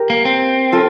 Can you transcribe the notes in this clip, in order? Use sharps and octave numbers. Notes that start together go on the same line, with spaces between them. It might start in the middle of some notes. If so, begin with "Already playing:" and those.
Already playing: G4 A#4
A#3
C4
F4 A4